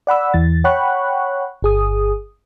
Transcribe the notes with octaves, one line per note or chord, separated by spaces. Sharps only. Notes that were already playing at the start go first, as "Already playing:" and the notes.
D5 F#5 B5 E6
E2 E3 A6
C#5 F#5 G5 B5 C#6 F#6
G1 G#4 D#6